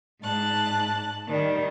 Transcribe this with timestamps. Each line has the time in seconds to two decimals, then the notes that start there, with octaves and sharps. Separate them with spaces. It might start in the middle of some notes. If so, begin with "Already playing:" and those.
0.23 G#2 A5 F#6
1.27 D#3 G3